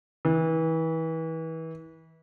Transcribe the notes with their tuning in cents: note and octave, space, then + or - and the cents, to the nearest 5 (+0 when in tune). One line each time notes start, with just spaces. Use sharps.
E3 -30